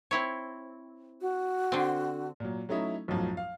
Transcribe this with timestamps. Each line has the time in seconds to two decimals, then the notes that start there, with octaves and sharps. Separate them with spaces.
0.11 C4 E4 C#5
1.21 F#4
1.72 D3 C4
2.40 A#2 F#3
2.69 F#3 A3 C#4 D#4 E4
3.08 B1 F#2 A2 F3 F#3
3.37 F5